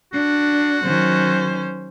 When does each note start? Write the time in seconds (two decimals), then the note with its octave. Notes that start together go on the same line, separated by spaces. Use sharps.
0.13 D4 F#4
0.84 D#3 F#3 C#4 C5